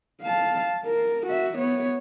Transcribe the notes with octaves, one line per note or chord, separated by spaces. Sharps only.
F5 A5
A#4
F#4 E5
B3 C#5